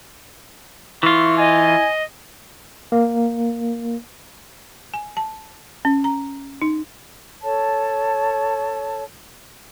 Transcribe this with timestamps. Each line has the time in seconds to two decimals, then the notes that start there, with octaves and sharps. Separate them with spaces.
1.03 E3 E4 F4 C#6
1.38 D#5 G#5
2.92 A#3
4.94 G#5
5.17 A5
5.85 C#4
6.04 A#5
6.62 D#4
7.43 A4 C#5 A5